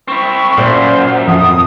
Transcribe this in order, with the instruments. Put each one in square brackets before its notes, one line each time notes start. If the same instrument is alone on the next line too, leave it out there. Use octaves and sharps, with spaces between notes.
[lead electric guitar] C4 E4 [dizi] C#6
[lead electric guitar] F#2 [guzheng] A#2 [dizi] C5
[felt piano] F2 [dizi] D#6